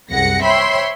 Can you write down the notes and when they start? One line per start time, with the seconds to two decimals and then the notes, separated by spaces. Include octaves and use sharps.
0.11 C2 F#2 G#4 F#5 A#6 C#7
0.44 C5 C#5 E5 G5 B5 C6